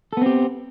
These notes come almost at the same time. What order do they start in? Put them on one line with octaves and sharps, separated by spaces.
A4 B3 C4 G4